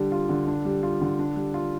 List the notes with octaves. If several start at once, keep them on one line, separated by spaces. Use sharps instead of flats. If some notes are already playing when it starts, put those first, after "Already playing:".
Already playing: D3 G3 D4
F4
D3
D4
G3
F4
D3
D4
G3
F4